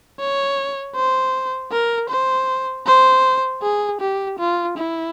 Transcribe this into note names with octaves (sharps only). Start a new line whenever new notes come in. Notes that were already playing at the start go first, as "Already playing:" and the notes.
C#5
C5
A#4
C5
C5
G#4
G4
F4
E4